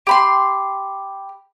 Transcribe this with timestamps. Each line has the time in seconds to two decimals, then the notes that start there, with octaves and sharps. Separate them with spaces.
0.07 G4 B5 C6